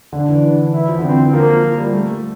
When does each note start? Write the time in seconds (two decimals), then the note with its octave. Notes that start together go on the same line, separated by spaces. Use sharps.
0.13 D3 D4
0.28 E3
0.37 D3
0.43 E3
0.73 E3 E4
0.89 F3
0.99 D3
1.03 E3 C4
1.19 E3
1.33 F3 A#3
1.64 F3
1.78 G3
1.93 A3